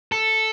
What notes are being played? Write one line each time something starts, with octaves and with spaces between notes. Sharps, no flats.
A4